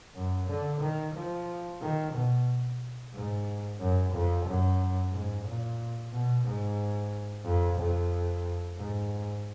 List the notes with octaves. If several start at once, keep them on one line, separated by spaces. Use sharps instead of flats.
F#2
D3
D#3
F3
D#3
B2
G#2
F#2
F2
F#2
G#2
A#2
B2
G#2
F2
F2
G#2